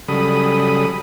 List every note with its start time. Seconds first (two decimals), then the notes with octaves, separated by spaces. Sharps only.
0.08 C#3 F#3 G3 A4 B5 D#6